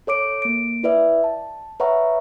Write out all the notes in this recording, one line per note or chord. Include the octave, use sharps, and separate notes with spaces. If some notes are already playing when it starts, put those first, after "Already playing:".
A4 C#5 D6 D7
A#3 D7
E4 B4 D5 E5
A5
B4 C#5 E5 F#5 A#5 C#6